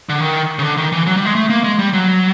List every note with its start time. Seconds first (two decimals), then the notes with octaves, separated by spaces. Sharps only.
0.09 D3
0.21 D#3
0.59 C#3
0.63 D3
0.77 D#3
0.92 E3
1.07 F#3
1.16 G3
1.26 G#3
1.35 A3
1.50 A#3
1.64 G#3
1.79 G3
1.93 F#3